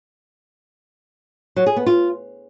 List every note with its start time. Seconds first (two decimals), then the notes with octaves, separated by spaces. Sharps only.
1.56 F#3
1.66 G#4
1.76 B3
1.86 F4